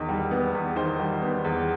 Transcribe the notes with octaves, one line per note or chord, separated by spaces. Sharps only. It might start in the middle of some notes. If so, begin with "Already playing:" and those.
Already playing: E2 D#3
G3
B3
E2
D#3 C5
G3
B3
E2